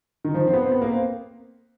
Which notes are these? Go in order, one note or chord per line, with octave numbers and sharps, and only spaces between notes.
D#3
F3
C4
B3
C4
B3
A#3
C4